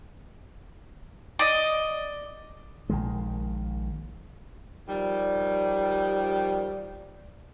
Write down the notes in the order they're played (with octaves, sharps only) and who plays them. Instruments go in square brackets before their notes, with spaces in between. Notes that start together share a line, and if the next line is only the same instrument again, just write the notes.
[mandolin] D5 D#5
[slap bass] A#1 D#3 G#3
[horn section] D#3 F3 G3